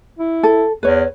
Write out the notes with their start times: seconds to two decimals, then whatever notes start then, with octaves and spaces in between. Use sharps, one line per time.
0.19 E4
0.43 A4
0.83 E2 B4 C#5